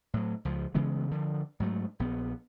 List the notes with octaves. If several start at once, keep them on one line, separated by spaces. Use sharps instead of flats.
A2 F#3
C#2 F3
C#3 E3 G#3 B3
D3 F3
G#2 F#3 A3
A#1 B3